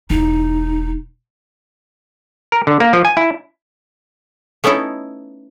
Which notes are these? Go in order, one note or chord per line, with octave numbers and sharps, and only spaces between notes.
E1 D#4 E4
A#4
D3
A#3
F3
G#5
E4
A3 B3 C#4 D#4 E4 A4